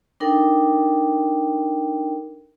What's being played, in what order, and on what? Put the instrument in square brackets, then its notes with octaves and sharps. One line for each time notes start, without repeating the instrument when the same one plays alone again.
[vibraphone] D4 D#4 A4 A#4 G5